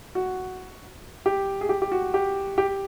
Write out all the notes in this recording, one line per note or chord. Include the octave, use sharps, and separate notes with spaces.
F#4
G4
G#4
G4
G4
F#4
G4
G4